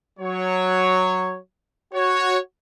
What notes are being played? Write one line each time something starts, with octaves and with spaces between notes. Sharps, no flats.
F#3 C#5
F#4 C#5